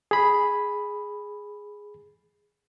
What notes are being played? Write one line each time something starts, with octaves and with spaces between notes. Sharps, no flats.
G#4 B5